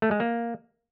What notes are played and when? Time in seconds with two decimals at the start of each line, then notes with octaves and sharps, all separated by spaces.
0.02 A3
0.11 G#3
0.20 A#3